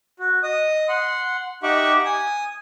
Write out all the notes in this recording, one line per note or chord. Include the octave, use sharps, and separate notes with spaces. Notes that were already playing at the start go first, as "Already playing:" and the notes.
F#4
D#5 D#6
F#5 C6
D#4 G4 E5 F#5 C#6 D6
G#5 D#6